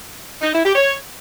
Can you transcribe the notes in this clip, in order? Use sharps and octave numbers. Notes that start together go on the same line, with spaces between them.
D#4
E4
G4
C#5